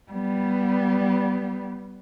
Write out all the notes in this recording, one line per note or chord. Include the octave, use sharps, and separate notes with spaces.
G3 B3